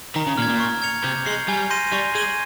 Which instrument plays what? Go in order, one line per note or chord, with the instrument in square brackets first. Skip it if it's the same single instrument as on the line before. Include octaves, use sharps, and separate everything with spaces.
[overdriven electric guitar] D#3 [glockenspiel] A#5
[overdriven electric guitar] C#3
[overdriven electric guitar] A#2 [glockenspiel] F6
[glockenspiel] G#6
[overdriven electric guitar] A#2
[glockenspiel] C#6
G#6 C#7 F7
[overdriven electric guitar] C3 [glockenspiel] G6
[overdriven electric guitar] G#3 [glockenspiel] C7
[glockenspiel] G7
[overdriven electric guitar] G3 [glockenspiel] G#5
[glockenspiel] C6 G6 A#6 D#7
[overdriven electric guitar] G3 [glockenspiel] C#6
[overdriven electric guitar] G#3 [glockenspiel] G#6 D#7 G7